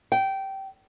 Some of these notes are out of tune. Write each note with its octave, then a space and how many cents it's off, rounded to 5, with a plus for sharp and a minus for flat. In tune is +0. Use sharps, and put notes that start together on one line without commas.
G5 -15